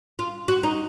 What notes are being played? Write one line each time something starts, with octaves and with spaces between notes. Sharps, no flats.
F4
F#4
D#4